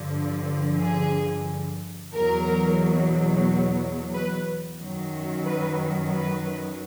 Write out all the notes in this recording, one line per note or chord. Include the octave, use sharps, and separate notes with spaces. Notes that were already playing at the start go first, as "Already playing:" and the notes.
Already playing: G2 D3 F3
G#4
E2 B2 F#3 A#4
B4
F#2 D#3 F#3
B4
B4